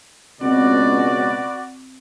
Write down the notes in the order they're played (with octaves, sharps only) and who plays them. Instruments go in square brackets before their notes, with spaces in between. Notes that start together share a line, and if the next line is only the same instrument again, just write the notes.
[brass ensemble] C#2 B2 [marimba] C4 [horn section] F#4 B4 D5